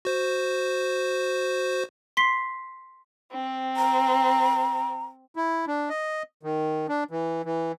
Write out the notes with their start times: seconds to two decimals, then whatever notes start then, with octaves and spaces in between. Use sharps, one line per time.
0.05 F#4 C5
2.17 C6 B6 C7
3.32 C4
3.76 A#5
5.36 E4
5.67 D4
5.89 D#5
6.43 D#3
6.89 D4
7.11 E3
7.45 E3